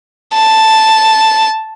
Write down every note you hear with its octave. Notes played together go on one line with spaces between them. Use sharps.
A5